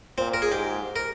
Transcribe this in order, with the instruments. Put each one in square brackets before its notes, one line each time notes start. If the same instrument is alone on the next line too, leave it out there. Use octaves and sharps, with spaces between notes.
[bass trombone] A#2 [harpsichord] C4
[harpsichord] A#4
G#4
[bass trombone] G#2 [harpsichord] G4
[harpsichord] A#4